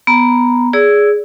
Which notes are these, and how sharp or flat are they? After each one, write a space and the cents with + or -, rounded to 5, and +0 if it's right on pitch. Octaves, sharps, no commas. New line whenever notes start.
B3 +0 A#5 +0
G#4 +0 D5 -30 E6 +0